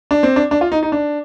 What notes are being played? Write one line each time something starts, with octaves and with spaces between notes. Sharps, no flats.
D4
C4
D4
D4
F4
D#4
D#4
D4